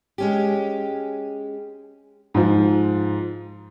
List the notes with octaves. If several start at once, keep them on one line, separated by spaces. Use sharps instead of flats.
G#3 C#4 G4
G#2 F3